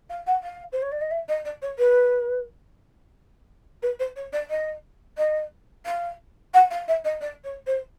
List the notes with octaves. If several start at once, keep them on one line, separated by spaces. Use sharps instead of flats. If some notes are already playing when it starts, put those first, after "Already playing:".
F5
F#5
F5
C5
C#5
D5
D#5
E5
D#5
D5
C#5
B4
B4
C5
C#5
D5
D#5
D#5
F5
F#5
F5
E5
D#5
D5
C#5
C5